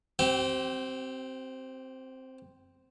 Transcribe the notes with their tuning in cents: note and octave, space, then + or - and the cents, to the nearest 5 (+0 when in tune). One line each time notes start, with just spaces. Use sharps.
C4 +0 G4 -40